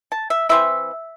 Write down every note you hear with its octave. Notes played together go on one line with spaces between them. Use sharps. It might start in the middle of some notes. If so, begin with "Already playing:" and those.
A5
E5
E3 C4 E4 E5